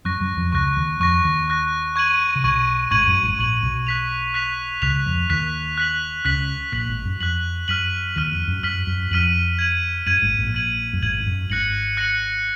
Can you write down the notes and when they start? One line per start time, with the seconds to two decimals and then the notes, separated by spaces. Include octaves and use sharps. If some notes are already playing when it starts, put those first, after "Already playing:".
0.05 F#2 F#3 C#6 F#6 A#6
0.20 F#2 F#3
0.37 F2 F3
0.52 C#2 C#3 C#6 F#6 A#6
0.77 D#2 D#3
1.00 F2 F3 C#6 F#6 A#6
1.24 D#2 D#3
1.48 C#6 F#6 A#6
1.96 C#6 G#6 D#7 F#7
2.36 C#3
2.44 B1 B2 C#6 G#6 D#7 F#7
2.91 G#1 G#2 C#6 G#6 D#7 F#7
3.07 F#2
3.23 G#1 G#2
3.39 A#1 A#2 C#6 G#6 D#7 F#7
3.62 B1 B2
3.87 F#6 B6 F7
4.34 F#6 B6 F7
4.82 C#2 C#3 F#6 B6 F7
5.06 F2 F3
5.30 D#2 D#3 F#6 B6 F7
5.78 F#6 B6 F#7
6.25 C#2 C#3 F#6 B6 F#7
6.72 A#1 A#2 F#6 B6 F#7
6.89 G#1 G#2
7.05 F#2
7.20 F2 F#6 B6 F#7
7.68 F#2 F6 B6 D#7 F#7
8.16 D#2 D#3 F6 B6 D#7 F#7
8.31 F2
8.48 F#2
8.63 F#2 F6 B6 D#7 F#7
8.87 F#2
9.11 F2 F6 B6 D#7 F#7
9.59 G#6 D#7 F#7
10.06 F#2 G#6 D#7 F#7
10.22 G#1 G#2
10.39 A#1 A#2
10.55 G#6 D#7 F#7
10.93 F#2
11.02 G#1 G#2 G#6 D#7 F#7
11.20 G#2
11.26 F#2
11.50 G#1 G#2 F#6 A#6 C#7 F#7
11.97 F#6 A#6 C#7 F#7